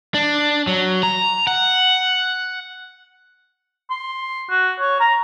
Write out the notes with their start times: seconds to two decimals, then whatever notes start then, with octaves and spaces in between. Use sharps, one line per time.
0.14 D4
0.67 F#3
1.03 A#5
1.47 F#5
3.91 C6
4.50 F#4
4.80 C#5
5.00 A#5